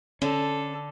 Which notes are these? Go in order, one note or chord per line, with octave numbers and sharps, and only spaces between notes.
D3 C#4 A4